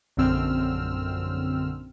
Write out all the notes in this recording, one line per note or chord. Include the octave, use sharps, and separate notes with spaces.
A#1 F#2 D3 C4 E6 F6